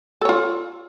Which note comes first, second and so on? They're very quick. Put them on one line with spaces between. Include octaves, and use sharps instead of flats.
A4 C#5 F4